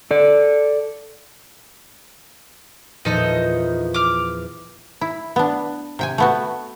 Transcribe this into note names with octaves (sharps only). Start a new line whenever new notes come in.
A4 D5
E2 A#2 F3 D#4 A4 D#5
D6 F6
E4
B3 D4
C3 G5 G#5
A3 B3 F#4